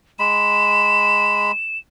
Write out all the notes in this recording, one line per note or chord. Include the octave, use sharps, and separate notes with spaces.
G#3 B5 E7